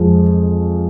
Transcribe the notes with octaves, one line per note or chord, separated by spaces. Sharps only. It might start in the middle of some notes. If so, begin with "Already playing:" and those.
Already playing: F2 F3 G#3